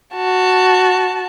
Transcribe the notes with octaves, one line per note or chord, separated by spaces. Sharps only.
F#4 A5